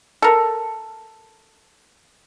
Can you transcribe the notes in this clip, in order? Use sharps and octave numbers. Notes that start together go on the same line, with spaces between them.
A4 A#4